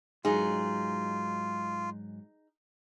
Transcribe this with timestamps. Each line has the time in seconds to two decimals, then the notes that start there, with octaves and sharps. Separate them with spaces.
0.25 G#2 F#3 D#4 F4 G#4